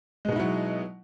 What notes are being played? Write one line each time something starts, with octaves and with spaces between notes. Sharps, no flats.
B2 F#3 G#3 D#4 E4